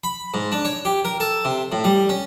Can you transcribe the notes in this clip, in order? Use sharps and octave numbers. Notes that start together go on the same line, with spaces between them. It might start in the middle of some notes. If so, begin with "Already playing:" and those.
B5
G#2
D4
C#5
G4
A#4
A4
C3
A2
G3
C#4